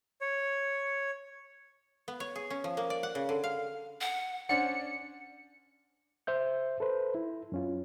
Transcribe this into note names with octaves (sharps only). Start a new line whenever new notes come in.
C#5
B3
C#5
G#4
C#4
F3
A#3
D5
F#5
C#3
D3
F5
F#5
C#4 D4 C5 D5 F#5 C#7
C5 E5 G6
A4 B4 C5
E4
F#2 C#4 F4